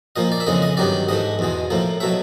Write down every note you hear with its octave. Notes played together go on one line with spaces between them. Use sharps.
A#2 F3 A#3 D#5
D5
E5
F2 C#3 E3 G#3 D#5
D#5
G2 D#3 F#3 B3 D5
G#2 E3 A3 D#5
E2 B2 G#3
A2 F3 A#3
B2 F#3 A3 E5